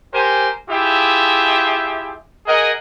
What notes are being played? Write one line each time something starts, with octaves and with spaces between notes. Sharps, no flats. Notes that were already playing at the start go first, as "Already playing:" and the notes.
G4 A#4 C5 G#5
E4 F4 G4 G#4 E5
G#4 A#4 D#5 F#5 G#5